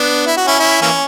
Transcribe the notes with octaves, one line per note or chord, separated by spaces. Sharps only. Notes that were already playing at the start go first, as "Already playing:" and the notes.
Already playing: B3 D4
E4
F#4
C#4 E4
C#4 E4
E3 A#3 C#4